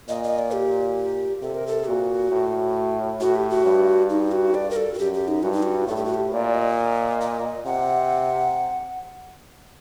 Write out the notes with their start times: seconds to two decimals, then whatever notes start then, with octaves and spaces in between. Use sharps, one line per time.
0.09 A#2 D#5
0.24 D#5
0.39 D5
0.53 G4
1.42 C3 A4
1.55 A#4
1.67 A4
1.87 A#2 F#4
2.32 A2
3.20 A2 F#4
3.35 G4
3.50 F#4
3.66 G2
4.10 D#4
4.32 F#4
4.54 D5
4.70 A#4
4.76 A4
4.94 F#4
4.99 F#2 G4
5.14 G4
5.28 D#4
5.43 G2 F#4
5.53 D#4
5.63 F#4
5.87 A2 A4
5.96 G4
6.06 F#4
6.14 G4
6.32 A#2 D5
6.54 D#5
7.21 D#5
7.66 C3 F#5